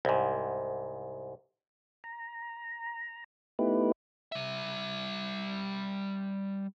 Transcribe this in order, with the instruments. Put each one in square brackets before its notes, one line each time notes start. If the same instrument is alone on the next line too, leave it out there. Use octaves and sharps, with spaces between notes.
[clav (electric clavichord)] C2 G#2
[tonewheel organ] A#5
A3 B3 D#4 E4 G4 B4
[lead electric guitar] G3 E5